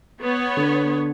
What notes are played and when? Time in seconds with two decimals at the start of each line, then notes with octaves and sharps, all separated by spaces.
0.21 B3 C#5
0.57 D3